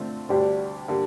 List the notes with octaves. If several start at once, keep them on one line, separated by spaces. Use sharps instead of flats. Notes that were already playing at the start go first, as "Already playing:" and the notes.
Already playing: D3 A3 C4 F4
D2 D3 G3 D4 G4
D3 G3 A#3